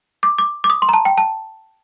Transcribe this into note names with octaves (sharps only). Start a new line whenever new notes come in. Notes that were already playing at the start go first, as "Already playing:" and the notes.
D6
D6
D6
D#6
C6
A#5
A5
G5
A5